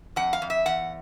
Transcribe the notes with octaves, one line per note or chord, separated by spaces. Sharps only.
F2 F#5
F5
F2
E5
E2 F#5